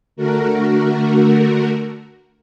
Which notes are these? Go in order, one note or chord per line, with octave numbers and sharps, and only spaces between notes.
D3 A3 F#4 A#4